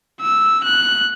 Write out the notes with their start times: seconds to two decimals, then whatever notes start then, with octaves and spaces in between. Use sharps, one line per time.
0.21 E6
0.64 F#6